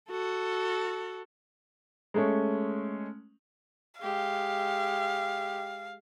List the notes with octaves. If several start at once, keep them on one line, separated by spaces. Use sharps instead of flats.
F#4 A4
G#3 A3 C#4
G#3 G4 F5